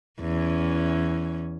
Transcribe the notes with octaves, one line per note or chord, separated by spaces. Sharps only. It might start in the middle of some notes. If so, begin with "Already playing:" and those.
E2 C#4